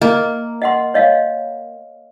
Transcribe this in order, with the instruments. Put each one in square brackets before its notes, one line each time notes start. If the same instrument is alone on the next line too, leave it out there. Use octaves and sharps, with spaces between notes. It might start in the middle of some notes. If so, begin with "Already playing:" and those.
[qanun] A#3 [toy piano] D#5
[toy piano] D#5 F#5 C6
C#5 D#5 F5